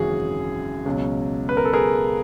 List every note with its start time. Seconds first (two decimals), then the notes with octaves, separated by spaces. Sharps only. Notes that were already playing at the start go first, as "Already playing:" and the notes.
Already playing: G#1 F#2 C#3 E3 F#4 G#4
0.86 C#2 B2 F#3
1.49 B4
1.57 A#4
1.65 A4
1.73 G#4 A#4